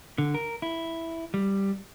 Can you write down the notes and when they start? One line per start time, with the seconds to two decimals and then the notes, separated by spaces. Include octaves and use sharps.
0.18 D3
0.34 A#4
0.62 E4
1.34 G3